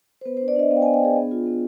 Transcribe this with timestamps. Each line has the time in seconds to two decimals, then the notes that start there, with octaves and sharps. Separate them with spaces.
0.21 C5
0.25 B3 B4
0.37 D4 C5
0.48 D5
0.56 D4 D#5
0.71 B3 F5
0.77 G5
0.82 B3 G#5
0.94 G5
1.01 D4 G#4
1.16 B3
1.31 F4
1.46 B3